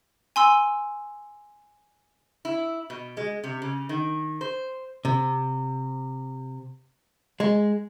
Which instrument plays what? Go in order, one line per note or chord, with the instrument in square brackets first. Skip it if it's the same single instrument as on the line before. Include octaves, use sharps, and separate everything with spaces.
[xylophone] G#5 C6 E6
[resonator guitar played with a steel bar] E4
B2
G#3
C3
C#3
D#3
C5
[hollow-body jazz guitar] C3
G#3